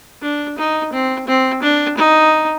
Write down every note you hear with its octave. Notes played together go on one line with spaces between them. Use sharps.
D4
D#4
C4
C4
D4
D#4